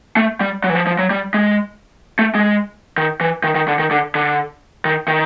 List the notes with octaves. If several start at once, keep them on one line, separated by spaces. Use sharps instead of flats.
A3
G3
F#3
E3
F3
F3
F#3
G3
G#3
A3
G#3
D#3
E3
D#3
D#3
D3
D#3
D3
D3
D#3
D#3